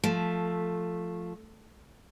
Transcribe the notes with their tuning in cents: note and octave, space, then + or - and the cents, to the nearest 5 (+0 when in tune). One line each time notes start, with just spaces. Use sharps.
F3 +0 A3 +0